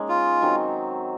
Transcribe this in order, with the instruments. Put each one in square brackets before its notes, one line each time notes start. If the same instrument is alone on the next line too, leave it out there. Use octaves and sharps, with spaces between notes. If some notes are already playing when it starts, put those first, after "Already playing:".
Already playing: [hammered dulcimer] G#3 A#3 C#4 D#4 G#4
[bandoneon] F4
[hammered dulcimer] D#3 F#3 C4